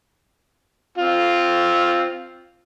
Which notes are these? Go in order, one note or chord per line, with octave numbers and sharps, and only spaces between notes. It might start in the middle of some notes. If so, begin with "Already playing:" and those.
C4 F4